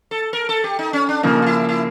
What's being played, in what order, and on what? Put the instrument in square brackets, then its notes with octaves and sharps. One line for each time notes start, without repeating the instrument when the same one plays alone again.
[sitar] A4
A#4
A4
G4
D#4
C#4
D4
[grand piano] C#3 F3 A#3 [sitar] D#4
[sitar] F4
E4
E4